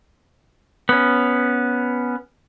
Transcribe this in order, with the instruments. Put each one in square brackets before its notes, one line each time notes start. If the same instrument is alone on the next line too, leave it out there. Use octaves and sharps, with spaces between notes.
[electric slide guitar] B3 C#4